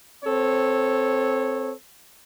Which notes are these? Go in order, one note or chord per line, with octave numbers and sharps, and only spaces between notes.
C4 A4 C#5